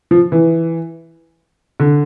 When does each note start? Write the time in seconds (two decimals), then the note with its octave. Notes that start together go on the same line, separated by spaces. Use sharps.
0.11 F3
0.32 E3
1.80 D3